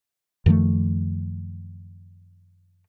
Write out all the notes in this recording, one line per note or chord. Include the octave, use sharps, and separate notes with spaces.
F#2 D#3 F3 A3